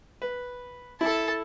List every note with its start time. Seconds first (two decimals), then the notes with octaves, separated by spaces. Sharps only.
0.22 B4
1.01 E4 A4 A5